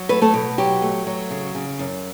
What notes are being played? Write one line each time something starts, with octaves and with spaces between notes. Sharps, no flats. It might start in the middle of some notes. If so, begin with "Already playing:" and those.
Already playing: F#3
A3 B4
A3 A4
B2
F#3 G4
A3
F#3
C#3
C#3
F#2